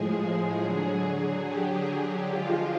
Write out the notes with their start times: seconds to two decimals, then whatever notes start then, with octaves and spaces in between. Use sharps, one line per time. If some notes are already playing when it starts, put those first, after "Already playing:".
Already playing: A2 F3 G#3 G#4
0.58 D3 F#3
1.44 G4
1.72 G#4
2.01 G4
2.29 D3 F3 G#3 F4